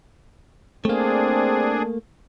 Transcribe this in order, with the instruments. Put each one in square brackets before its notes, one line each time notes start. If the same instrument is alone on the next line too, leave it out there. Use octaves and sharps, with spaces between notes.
[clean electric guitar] A3 A#3 [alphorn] C4 [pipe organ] D4 G#4